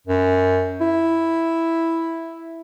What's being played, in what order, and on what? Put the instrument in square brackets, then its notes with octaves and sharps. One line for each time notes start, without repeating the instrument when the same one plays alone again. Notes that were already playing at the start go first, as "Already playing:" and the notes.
[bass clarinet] F#2
E4